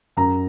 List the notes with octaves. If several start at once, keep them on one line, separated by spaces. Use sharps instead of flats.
F#2 A#5